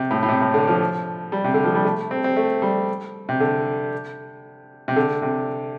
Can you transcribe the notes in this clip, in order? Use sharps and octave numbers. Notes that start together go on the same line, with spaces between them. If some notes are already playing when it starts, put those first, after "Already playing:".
Already playing: C3
A2
A2
C3
A2
D3
F3
G3
C3
D3
F3
G3
A3
C4
C4
A3
G3
C3
D3
C3
D3
C3